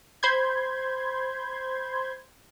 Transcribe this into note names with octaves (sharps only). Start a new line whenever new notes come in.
C5 B5 C6 G6 G#6